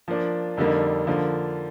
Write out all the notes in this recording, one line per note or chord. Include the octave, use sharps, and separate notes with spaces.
F3 A#3 D4
F2 D3 G3 A#3 D#4
D3 F3 A#3